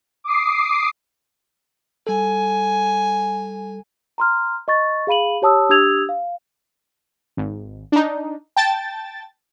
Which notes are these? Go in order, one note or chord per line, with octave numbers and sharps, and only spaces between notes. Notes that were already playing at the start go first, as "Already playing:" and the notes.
D6 D#6 C7
G3 A4 G#5
A#5 C6 F6
D#5 C#6 A6
G#4 F5 B5 D#7 F#7
G4 C#5 A5 D#6 E6
D4 G4 D#6 E6 G#6 F7
F5
G#1
D4 D#4
G5 A5 A6